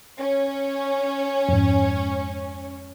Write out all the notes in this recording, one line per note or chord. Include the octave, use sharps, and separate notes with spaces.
C#4 C#5
F2 G#2